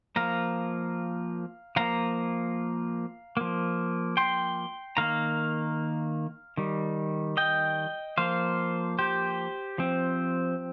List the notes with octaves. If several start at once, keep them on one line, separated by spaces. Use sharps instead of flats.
F3 A#3 F5 A#5
F3 A#3 F5 A#5
F3 A#3
G5 C6
D#3 A#3 F5 A#5
D#3 G3
D#5 G5
F3 A#3 C5 F5
G4 C5
F3 C4